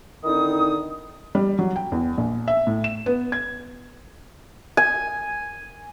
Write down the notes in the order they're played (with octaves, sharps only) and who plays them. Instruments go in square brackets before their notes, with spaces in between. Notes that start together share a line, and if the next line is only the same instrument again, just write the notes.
[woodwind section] D3 D#3 C4 D#4 E4 D#6
[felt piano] G3
F#3
G5
E2
A#1
E5
A2
E7
B3
G#6
[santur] G#5